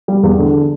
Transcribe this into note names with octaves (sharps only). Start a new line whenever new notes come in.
G3
E2
D3